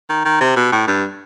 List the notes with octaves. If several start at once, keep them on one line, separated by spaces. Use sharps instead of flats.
D#3
D#3
C3
B2
A2
G2